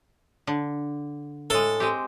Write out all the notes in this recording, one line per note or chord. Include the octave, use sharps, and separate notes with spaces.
D3
A2 G#3 A4
G#3 C4 G4